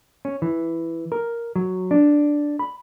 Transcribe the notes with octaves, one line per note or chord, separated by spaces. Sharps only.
C#4
E3
A#4
F#3
D4
B5